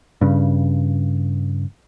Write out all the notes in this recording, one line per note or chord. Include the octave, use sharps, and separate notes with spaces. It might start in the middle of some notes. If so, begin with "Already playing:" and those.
G2 C#3